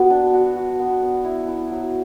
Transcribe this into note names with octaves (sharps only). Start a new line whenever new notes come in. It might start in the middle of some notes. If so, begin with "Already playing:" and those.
Already playing: B3 F#4
D4
F#4
F#4
B3
B3
E4
E4
F#3